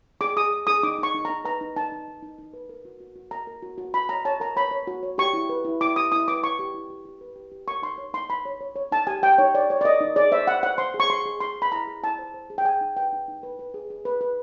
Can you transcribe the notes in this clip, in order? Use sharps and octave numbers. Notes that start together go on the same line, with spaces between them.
G#4 D6
G#4 D#6
G#4
G#4 D#6
D#4 D6
D#4 C#6
D#4
D#4 A#5
B4 A#5
D#4
D#4 A5
D#4
D#4
D#4
D#4
B4
A#4
F#4
F#4
F#4
A#4 A#5
A#4
F#4
F#4
F#4 B5
C#5 A#5
C#5 A5
A#4 A#5
C#5 B5
C#5
F#4
C#5
G4 C#6
E4
B4
E4
E4 D6
G4 D#6
E4 D#6
B4 D6
E4 C#6
G4
E4
G4
G4
B4
G4
G4
A#4 C#6
D#4 C6
C#5
D#4 C6
D#4 B5
C#5
C#5
C#5
D#4 A5
G4 G#5
G4 G5
D#4 C#5
C#5 D5
C#5
D5
A#4 D#5
D#4
G#4 D5
C5 E5
C5 F#5
C5 F#5
C5 C6
G#4
C#6
G#4 C6
G#4
G#4 C6
G#4
B5
E4 A#5
G#4
E4 A5
C5
C5
G#4
G5
G#4 G#5
D#4
B4 G5
D#4
D#4
B4
B4
G#4
G#4
B4
B4